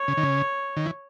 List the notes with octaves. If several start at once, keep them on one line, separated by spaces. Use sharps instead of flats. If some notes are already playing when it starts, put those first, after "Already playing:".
Already playing: C#5
C#3
D#3
C#3
D#3
E3